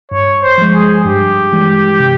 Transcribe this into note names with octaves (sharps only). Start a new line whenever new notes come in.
G2 C#5
C5
F3 G#3
G#4
G2 G4
E3 G#3
C3